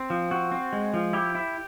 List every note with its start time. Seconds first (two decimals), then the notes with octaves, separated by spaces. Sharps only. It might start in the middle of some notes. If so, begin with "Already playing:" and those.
Already playing: C4
0.10 F3
0.31 C4 F#4
0.51 C4
0.73 G#3
0.94 F3
1.13 E4 G4
1.35 E4